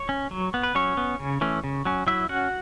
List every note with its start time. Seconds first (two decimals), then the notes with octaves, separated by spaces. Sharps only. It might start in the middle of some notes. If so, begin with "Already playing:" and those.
Already playing: C#5
0.09 C#4
0.31 F#3
0.54 B3
0.63 B4
0.75 F#3 C#4 C#5
0.97 B3
1.20 C#3
1.41 E3 A3 C#4
1.64 C#3
1.85 F#3 C#4
2.07 F#3 E4 E5
2.29 C#4 F#4 F#5